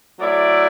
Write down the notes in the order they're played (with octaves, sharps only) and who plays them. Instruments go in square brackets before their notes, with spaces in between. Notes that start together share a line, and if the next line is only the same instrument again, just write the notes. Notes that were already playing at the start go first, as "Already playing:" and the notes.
[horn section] F#3 A3 E4 D5